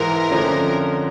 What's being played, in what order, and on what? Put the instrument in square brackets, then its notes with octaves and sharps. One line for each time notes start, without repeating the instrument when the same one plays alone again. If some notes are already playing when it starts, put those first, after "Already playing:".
Already playing: [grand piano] G#2 E3 G#3 [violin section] A#4
[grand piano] F2 D3 F3 A3 C#4